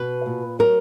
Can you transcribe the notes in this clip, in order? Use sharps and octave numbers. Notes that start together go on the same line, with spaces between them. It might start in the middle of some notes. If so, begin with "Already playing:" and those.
Already playing: B2 B4
A#2
F#3 A#4